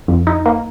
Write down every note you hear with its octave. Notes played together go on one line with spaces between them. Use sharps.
F2
D#4
A#3